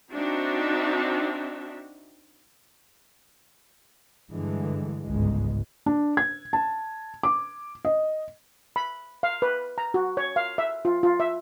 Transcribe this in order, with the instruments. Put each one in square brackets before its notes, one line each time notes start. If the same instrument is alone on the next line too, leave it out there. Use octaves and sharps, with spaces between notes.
[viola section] C4 D4 D#4 F#4 E5
[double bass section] G2 D3 E3 G#3
G1 C#2 G#2 G#3
[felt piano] D4
G#6
A5
D6
D#5
[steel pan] B5
F5
B4
A#5
F#4
C#5
F5
E5
F4
F4
E5